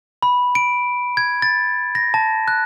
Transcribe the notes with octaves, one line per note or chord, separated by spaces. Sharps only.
B5
D7
G#6
A6
A#6
A5
F#6